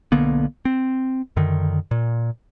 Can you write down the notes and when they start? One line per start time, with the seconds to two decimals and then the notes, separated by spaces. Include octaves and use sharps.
0.12 B1 D3 A#3 B3
0.65 C4
1.37 F#2 D3 D#3
1.91 A#2